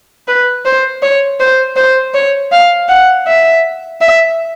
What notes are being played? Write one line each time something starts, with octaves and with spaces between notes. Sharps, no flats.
B4
C5
C#5
C5
C5
C#5
F5
F#5
E5
E5